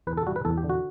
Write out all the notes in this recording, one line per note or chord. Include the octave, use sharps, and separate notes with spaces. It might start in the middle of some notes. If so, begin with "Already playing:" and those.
E2 B4
A4
G3 F#4
B4
E2 A4
G4
D3
F#4